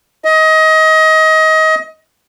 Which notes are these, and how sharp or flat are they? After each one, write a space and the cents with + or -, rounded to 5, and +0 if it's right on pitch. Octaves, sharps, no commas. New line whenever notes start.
D#5 +25